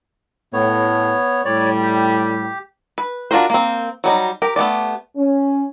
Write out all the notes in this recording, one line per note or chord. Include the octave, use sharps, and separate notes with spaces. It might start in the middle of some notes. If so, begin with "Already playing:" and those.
A2 B3 C#5
A2 G3 C#5 D5
G4
B4
D4 F4 F#4 A#4 C5
A#3 C4
F#3 G3 D#4
G4 A#4
A3 B3 G4 D5
C#4